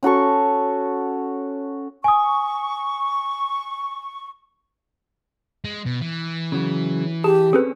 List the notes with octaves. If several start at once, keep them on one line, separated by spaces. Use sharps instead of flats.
C#4 F#4 A4 C#6
G#5 C#6 D#6
G#3
B2
E3
C#3 F#3
G4 G#4 A5
C4 C#4 G#4 A4 B4